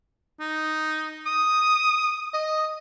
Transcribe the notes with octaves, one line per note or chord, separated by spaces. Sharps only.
D#4
D#6
D#5